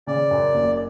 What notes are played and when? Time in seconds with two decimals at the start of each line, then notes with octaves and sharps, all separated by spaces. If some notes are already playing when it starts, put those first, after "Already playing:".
0.07 C#3 D5
0.31 F#2
0.55 F#1